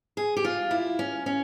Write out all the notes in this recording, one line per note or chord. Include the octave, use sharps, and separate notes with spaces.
G#4
G4
F4
E4
C#4
C#4